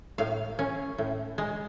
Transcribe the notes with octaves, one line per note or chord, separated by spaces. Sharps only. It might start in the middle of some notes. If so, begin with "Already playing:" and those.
A2 F5
C#4
A2
G#3